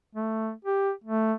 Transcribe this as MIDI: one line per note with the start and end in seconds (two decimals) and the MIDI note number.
0.15 0.51 57
0.65 0.91 67
1.04 1.33 57